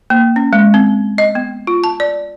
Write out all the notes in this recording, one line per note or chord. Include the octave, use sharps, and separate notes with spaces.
A#3
C#4
G#3
C4
D#5
B3
F4
A5
D5